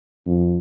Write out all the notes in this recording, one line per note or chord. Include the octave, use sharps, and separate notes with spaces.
F2